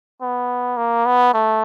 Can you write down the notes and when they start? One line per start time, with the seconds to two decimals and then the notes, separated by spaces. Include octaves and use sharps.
0.22 B3
0.77 A#3
1.06 B3
1.34 A3